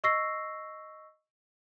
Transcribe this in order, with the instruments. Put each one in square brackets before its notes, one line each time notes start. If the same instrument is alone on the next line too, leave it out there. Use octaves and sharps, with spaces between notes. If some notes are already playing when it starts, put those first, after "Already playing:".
[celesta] D#5 C#6 E6 A#6 C7